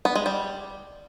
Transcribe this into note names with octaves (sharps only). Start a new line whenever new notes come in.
B3
G#3
G3